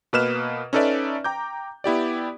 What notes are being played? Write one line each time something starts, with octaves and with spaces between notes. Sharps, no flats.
B2 A#3 B4 D#5 F6 E7
C#4 D#4 A4 B4 D5 E5
G5 A#5 D6 G6
B3 E4 G4 D5